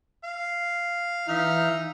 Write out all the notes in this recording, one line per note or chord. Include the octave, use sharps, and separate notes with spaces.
F5
E3 D#4 E5 F5 F6